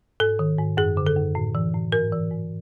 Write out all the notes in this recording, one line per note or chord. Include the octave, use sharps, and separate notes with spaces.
G#2 A4
D#3
G#2
F#2 G#4
D3
A4
F#2
A2
E3
A2
G#2 A#4
E3
G#2